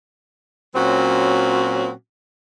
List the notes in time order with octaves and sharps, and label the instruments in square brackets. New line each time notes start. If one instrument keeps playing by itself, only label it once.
[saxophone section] A#2 F#3 C4 C#4 F#4